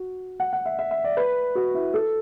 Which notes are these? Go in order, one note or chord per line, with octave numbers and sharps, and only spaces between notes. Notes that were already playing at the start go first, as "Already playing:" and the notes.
Already playing: F#4
F#5
F#5
E5
E5
E5
D5
B4
F#4
E4
A4